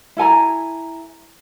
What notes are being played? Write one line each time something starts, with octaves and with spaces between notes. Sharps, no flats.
E4 A4 G#5 A#5